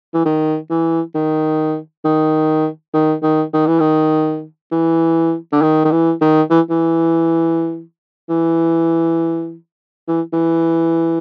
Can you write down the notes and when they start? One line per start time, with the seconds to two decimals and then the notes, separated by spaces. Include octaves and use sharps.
0.14 E3
0.26 D#3
0.70 E3
1.15 D#3
2.05 D#3
2.94 D#3
3.23 D#3
3.54 D#3
3.67 E3
3.80 D#3
4.71 E3
5.52 D3
5.62 D#3
5.85 D#3
5.92 E3
6.21 D#3
6.50 E3
6.70 E3
8.29 E3
10.08 E3
10.33 E3